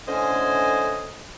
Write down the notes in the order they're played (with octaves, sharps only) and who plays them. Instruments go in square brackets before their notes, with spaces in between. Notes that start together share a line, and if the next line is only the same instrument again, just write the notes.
[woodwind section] A2 D3 C#4 C5 D#5 G#5